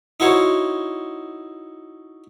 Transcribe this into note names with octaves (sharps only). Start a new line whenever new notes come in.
D#4 E4 F#4 C5 C#5